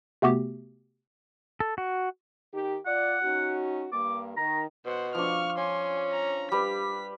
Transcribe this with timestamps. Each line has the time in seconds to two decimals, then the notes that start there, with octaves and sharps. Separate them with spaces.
0.22 C3 A3 B3 F#4 G4
1.60 A4
1.78 F#4
2.54 D#3 D#4 G4
2.86 F4 D5 F#5
3.22 C#4 D#4 F#4
3.92 G2 A#3 D6
4.37 D#3 A#5
4.86 B2 C5 F#5
5.15 F3 D4 C#6 F6
5.58 C#4 G#5 C6
6.12 A#5
6.52 G3 B4 B6